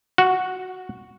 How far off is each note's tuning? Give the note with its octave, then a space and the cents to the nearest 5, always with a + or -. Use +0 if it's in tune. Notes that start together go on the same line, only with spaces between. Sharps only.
F#4 +0 F#5 -25